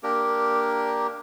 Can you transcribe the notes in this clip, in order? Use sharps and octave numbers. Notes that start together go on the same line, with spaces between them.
A#3 D4 G4 A#4